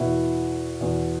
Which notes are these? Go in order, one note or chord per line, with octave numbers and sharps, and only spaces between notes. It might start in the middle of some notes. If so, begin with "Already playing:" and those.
Already playing: E2 B2 E4
E2 B2